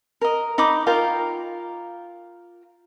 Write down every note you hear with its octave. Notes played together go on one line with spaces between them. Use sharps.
A#4 D#5
D#4 B5 D6 D#6
F4 A#4 F5 G5